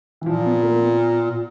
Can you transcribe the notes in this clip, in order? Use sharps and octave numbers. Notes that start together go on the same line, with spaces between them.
E3
A#2 F3
B3
A#3
B3
A#2